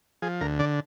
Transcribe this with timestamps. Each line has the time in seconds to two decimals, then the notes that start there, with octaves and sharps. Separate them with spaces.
0.22 F3 G#4
0.41 D2 A#4
0.59 D3 D5